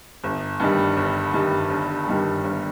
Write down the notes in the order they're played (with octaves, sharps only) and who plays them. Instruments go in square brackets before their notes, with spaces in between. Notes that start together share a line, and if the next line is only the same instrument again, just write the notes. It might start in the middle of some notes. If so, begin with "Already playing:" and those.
[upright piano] G1
G2 D#3 G3
G1
G2 D#3 G3
G1
G2 D#3 G3
G1